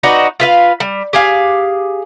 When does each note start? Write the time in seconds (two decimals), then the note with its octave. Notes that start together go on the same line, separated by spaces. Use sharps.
0.03 D#4 F#4 B4 D5
0.40 F4 B4 F5
0.80 G3
1.13 G4 G#4 F5